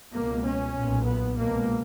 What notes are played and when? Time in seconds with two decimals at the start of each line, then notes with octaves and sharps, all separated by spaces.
0.13 C#2 B2 A#3
0.45 C#4
0.74 B1 A#2
1.06 B3
1.36 B2 A#3
1.41 C#2